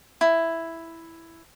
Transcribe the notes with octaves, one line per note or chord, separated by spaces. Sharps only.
E4